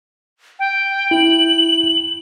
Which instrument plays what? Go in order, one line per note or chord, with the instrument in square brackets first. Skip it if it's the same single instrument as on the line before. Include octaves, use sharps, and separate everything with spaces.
[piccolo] G5
[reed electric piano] E4 [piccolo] F#7